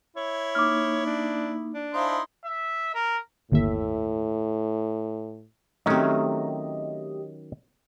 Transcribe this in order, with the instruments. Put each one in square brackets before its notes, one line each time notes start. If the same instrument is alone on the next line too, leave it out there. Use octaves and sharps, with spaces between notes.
[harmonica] E4 [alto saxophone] C#5
[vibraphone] A#3 D#4 [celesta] D6 F6
[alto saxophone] D4
D4
[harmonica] D#4 E4 C6 [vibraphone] C5 F5 A5
[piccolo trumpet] E5
A#4
[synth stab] G1 D#2 E5 [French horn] A2
[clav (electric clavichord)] D#3 F#3 C#4 [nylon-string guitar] A3 C4 [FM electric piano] G4 D#5